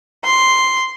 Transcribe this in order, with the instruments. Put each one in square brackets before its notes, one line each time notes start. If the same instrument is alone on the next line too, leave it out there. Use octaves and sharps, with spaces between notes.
[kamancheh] C6